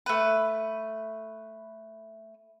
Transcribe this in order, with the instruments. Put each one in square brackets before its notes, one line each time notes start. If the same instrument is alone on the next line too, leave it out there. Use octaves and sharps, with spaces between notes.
[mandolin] A3 B4